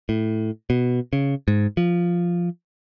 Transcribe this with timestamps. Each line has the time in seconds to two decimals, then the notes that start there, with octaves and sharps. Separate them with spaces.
0.09 A2
0.70 B2
1.13 C#3
1.48 G#2
1.77 F3